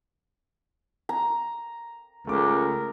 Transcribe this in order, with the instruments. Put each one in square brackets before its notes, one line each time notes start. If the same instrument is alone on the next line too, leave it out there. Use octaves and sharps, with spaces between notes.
[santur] A#5
[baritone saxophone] C#2 [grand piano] A3 D6 [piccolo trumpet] A#4